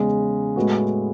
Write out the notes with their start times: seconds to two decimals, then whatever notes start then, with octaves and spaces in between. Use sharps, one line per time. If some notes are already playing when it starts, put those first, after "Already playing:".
Already playing: E2 C#3 G#3
0.56 A2 G#3 B3 F#4